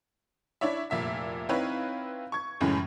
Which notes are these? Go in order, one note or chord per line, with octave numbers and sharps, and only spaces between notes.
D4 E4 C#5 D5 E5
F1 A#2 E5 B6
C4 D#4 E4 B4 C#5 F5
C#6 G#6
F#2 A2 C#3 E3 G#3 C#4